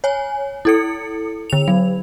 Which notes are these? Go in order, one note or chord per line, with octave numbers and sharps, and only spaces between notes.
C#5 G#5
E4 A4 C#7
D3 F7
F#3